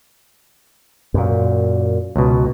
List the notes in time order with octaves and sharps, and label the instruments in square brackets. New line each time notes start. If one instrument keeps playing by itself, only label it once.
[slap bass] F#2 A#2
[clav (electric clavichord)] C#2 B2